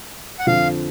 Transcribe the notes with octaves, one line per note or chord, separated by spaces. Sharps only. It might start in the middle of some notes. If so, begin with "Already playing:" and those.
F#5
F2 D3 F3 F5